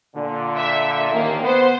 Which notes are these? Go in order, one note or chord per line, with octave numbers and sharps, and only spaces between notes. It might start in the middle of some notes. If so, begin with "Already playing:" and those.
A#2 D3
E5
A1 D#2 D#3 A#3
B3 C5